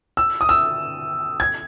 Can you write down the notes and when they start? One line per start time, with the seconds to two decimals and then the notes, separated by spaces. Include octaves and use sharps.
0.17 E6
0.41 D#6
0.49 E6
1.40 G#6